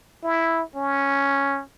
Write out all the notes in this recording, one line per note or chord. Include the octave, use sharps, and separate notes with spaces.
E4
C#4